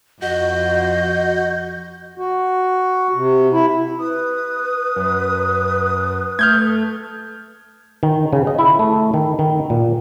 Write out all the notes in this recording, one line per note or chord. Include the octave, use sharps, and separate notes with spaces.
F2 F#4 D#5 G6
F#4
C3
E4
B4 D#6
F#2
A3 F6 G6 G#6
D#3
C#3
D#5
E4
A3
D#3
D#3
A#2